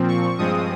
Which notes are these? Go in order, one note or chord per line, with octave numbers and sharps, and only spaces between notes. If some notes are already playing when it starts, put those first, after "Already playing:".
Already playing: A#2 F3 C4
C#6
G2 F3 G#3 C4 D#6